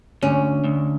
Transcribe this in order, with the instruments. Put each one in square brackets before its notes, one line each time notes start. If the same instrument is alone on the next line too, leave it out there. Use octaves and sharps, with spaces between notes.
[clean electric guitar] D2 [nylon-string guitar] C#4
[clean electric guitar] D2